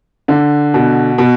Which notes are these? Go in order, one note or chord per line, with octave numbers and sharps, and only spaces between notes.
D3
B2
B2